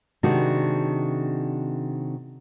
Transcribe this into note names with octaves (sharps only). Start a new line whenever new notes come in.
C3 D#3 G#3 D4 F#4